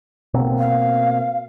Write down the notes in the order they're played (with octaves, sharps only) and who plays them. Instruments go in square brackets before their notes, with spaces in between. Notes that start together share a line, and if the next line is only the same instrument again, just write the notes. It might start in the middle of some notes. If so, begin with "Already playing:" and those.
[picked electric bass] B2 A#3 C4
[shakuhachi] F5